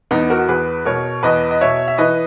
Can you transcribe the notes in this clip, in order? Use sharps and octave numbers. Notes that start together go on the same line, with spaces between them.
E2 B3 D#4
F#4 A#4
E2 G#4 B4
B2 A#4 C#5
E2 B4 D#5
D#5
B2 C#5 E5
E5
E3 B4 D#5